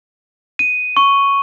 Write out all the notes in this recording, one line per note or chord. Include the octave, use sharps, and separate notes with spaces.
D#7
C#6